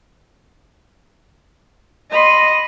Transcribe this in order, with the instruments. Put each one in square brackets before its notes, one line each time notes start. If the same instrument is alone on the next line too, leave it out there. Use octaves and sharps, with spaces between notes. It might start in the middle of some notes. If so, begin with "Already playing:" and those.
[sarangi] D#5 [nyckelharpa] B5 C6